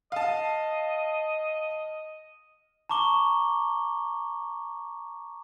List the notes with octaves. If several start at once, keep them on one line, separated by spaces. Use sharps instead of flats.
D#5 F5 A5
A5 A#5 C#6 D6 G7